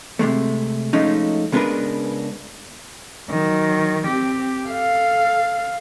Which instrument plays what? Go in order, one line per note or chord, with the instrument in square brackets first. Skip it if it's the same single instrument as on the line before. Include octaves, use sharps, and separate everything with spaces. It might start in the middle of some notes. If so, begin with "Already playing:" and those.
[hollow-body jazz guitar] C3 E3 G#3 A3
F3 G#3 A3 C#4 D#4
C#3 G#3 B3 D4 A#4 B4
[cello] D#3 F#3
C4 G4
A4 F5